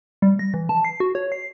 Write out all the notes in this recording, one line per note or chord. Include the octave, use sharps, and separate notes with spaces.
G3
A#6
E3
A5
C7
F#4
C#5
C7